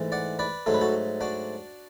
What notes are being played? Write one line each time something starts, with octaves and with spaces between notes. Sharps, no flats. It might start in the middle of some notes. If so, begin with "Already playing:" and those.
Already playing: G#2 E3 A3
D5 F#5
B4 D5
G#2 F#3 A3 A4
B4
F#4 A4
D4 F#4